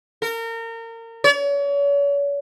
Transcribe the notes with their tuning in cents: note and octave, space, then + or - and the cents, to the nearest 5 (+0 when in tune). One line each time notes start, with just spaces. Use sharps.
A#4 -30
C#5 +40